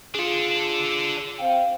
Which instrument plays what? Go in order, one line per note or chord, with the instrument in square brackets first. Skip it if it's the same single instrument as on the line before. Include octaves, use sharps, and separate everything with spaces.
[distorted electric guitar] D4 A4 [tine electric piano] F4 G#4
[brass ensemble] C4 F5 G5